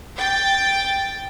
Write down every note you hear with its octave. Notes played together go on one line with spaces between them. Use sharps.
G5 A6